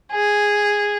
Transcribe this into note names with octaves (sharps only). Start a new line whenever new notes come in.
G#4